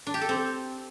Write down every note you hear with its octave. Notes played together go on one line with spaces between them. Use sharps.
D4
G4
A4
C4